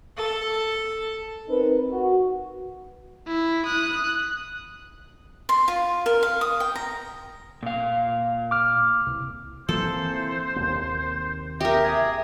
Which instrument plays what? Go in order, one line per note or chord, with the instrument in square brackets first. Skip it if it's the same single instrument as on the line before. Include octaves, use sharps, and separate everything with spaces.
[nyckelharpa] A4
[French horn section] C4 D#4 A#4 B4
F#4
[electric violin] E4
D#6 F#6
[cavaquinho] C6
F4
A#4
F5
D#6
G5
A#5
[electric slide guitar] A#2 F5
[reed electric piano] D6 F6
C2
[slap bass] E3 A#3 C4 [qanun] A4 [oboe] C5
[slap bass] D#2 C3 A#3
[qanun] G4 A#4 [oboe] D#5 [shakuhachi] E5
[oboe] G#4